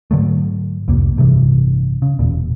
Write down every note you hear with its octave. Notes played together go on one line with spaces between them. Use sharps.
G#2 D3 F#3 A3
C2 F2 A#3
A1 G2 C3 E3
C#3
E1 A#2